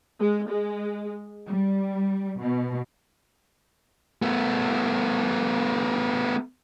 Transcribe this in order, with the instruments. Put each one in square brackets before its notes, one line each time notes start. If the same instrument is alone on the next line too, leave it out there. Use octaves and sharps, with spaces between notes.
[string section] G#3
G#3
G3
B2
[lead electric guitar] A3 B3